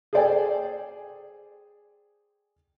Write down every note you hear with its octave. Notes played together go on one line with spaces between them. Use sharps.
G#4 A4 C5 D5 G5 G#5